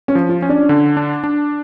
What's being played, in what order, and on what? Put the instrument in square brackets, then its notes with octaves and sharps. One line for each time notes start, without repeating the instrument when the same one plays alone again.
[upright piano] C#4
[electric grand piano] F3
[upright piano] F4
[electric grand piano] C#4
[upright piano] D4
[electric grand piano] D3
D4
D4